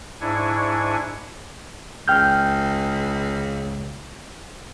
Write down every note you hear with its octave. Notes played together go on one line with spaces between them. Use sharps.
G#2 D4 E4 G#5 C#6
C#2 G5 F6 G6